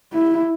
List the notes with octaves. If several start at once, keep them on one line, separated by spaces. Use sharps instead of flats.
E4